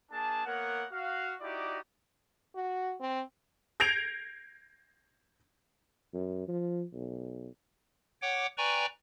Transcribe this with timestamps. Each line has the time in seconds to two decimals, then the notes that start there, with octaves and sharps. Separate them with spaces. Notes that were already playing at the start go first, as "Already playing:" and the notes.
0.11 A#3 D4 G#4 A5
0.45 A#3 B3 A#4 C#5 F#5
0.91 F#4 F5
1.41 D#4 E4 F#4 G4 D5 D#5
2.55 F#4
3.00 C4
3.80 G6 G#6 A#6 C7 D7 F7
6.14 F#2
6.48 F3
6.93 B1
8.22 C#5 F#5 G5 D6
8.58 B4 D5 G5 G#5 A#5 C#6